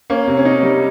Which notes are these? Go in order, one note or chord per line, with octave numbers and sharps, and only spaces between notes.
A#3 C#4
C3
C#4
C3 D#4
G3